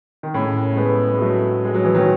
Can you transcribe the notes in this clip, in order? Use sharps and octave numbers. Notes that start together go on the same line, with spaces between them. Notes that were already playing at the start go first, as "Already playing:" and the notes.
D#3
A2 C#3
A3
G#3 B3
G#3
F#3 A3
G#3
F#3
E3
D#3 F#3